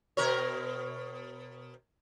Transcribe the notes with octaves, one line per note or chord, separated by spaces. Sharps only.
B2 A#4 C#5